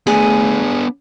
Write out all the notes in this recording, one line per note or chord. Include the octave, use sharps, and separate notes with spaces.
A3 B3 D4 G#4